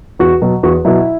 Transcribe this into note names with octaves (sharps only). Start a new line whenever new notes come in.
E2 F#4
B2 F#3
E2 F#4
B2 F#3 E4